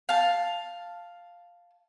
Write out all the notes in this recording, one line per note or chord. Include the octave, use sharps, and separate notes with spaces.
F5 A5